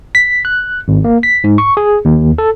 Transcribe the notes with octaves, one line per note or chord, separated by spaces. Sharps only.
B6
F#6
G#1
A#3
B6
G#2
C#6
G#4
D#2
A4